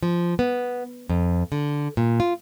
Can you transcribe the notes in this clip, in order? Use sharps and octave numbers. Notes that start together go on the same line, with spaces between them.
F3
B3
F2
D3
A#2
F4